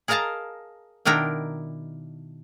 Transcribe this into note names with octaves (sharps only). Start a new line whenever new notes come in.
G#4 A#4 D#5 F5 A5 A#5
B2 D#3 D4 E4 A#4 G5